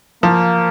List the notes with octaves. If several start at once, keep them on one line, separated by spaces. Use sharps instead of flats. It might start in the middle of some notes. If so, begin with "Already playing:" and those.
F3 A#3